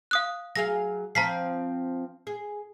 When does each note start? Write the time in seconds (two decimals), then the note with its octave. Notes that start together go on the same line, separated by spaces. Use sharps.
0.11 F5 D#6 F#6
0.56 F#3 G#4 F5 A#6
1.15 F3 C4 A#5 B6 C7
2.27 G#4